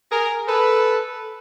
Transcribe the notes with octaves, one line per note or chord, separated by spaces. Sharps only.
G#4 A#4
A4 B4